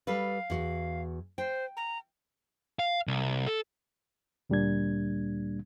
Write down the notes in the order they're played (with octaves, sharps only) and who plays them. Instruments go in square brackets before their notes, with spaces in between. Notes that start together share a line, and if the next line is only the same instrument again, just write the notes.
[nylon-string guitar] G3 A4 B4 [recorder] F5
[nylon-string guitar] E2 F#4
[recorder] C5 [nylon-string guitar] G5
[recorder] A#5
[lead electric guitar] F5
C2
A4
[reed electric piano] D2 A#2 G3 A#3 D4 G#6